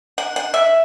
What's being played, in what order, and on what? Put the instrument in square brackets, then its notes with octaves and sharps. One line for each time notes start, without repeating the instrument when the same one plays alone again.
[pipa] F#5
F#5
E5